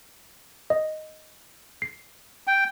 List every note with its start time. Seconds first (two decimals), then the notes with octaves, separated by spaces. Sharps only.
0.70 D#5
1.82 C7
2.47 G5